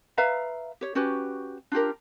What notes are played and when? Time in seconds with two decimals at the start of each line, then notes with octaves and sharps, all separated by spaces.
0.17 B4 E5 F5 A#5
0.81 G4 C#5
0.95 C#4 F#4 G4 B4
1.72 D4 F4 G4 A#4